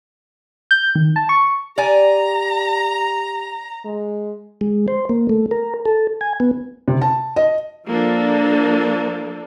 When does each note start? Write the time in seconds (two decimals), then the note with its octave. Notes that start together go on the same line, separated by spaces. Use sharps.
0.71 G6
0.95 D#3
1.16 A5
1.29 C#6
1.78 G4 D5 G#5 A#5
3.85 G#3
4.61 G#3
4.88 C5
5.09 A#3
5.29 A3
5.51 A#4
5.86 A4
6.21 G#5
6.40 B3
6.88 C3
7.01 A5
7.36 D#5
7.87 F3 A#3 D4 A4